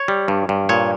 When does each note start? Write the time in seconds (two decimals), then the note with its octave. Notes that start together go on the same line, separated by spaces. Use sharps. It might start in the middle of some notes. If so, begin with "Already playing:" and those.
Already playing: C#5
0.08 G3
0.28 G2
0.49 G2
0.69 A#2 C#5